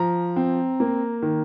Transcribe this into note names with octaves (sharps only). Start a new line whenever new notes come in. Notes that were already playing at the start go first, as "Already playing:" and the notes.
Already playing: F3 A#5
C4
A#3
D#3